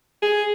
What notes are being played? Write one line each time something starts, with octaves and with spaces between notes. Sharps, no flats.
G#4